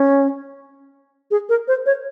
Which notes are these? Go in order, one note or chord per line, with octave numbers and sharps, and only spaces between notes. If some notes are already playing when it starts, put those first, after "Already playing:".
Already playing: C#4
G#4
A#4
C5
C#5